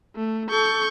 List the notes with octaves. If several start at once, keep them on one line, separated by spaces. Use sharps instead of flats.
A3
A4 C#6 G6